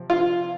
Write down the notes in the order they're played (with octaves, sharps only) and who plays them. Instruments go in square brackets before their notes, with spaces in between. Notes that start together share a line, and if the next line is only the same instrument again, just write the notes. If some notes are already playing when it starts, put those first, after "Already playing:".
Already playing: [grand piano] C3 F3 C4
[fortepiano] F4